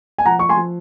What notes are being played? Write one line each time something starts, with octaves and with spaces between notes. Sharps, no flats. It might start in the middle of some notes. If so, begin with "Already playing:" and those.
G#5
F3 F#5 A#5
C#6
G#5 C6
F3